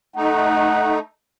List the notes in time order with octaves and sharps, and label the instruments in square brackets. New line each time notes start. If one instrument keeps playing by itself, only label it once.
[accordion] A3 D#4 [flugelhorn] F#5